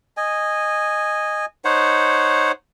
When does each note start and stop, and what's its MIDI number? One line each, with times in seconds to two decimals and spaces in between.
0.17 1.45 75
0.17 1.45 80
1.65 2.52 63
1.65 2.52 72
1.65 2.52 73
1.65 2.52 78